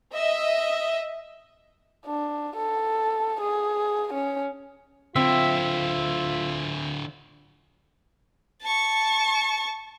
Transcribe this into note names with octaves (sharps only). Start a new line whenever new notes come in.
D#5 E5
D4
A4
G#4
C#4
D3 C4 E4 F4 E5
A5 C#6